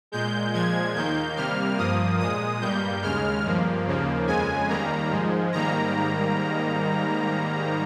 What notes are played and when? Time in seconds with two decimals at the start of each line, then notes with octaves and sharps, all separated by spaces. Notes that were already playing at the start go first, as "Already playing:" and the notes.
0.12 A#2 G#3 G6
0.53 A#2 F3 G#3 G#6
0.95 D#2 D#3 A#3 G6
1.36 C3 G3 A#3 F6
1.78 G2 F3 A#3 D#6
2.20 A#2 G#3 D#6
2.61 G2 G3 A#3 G6
3.02 D#2 C#3 G#3 F6
3.45 G2 F3 A#3
3.86 D#2 C#3 F3 A#3
4.27 F2 C#3 G#3 G#5
4.69 D#2 D#3 G3 A#3 A#5
5.11 G#2 F3 G#3
5.52 G#2 D#3 G3 A#3 A#5